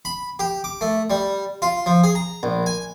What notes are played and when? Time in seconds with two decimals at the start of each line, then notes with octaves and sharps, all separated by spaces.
0.05 B5
0.39 G4
0.64 D6
0.81 A3
1.10 G3
1.62 F4
1.86 F3
2.04 G#4
2.15 A#5
2.43 A#1
2.66 G#5